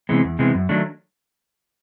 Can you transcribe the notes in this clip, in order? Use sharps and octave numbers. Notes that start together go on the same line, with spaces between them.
C3 E3 G#3 B3
E2
C3 E3 G#3 B3
F#2
D#3 F#3 A3 D4